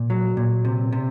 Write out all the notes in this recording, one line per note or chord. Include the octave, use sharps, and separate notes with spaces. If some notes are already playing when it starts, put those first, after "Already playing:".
Already playing: A#2
F#3
A#2
C3
C3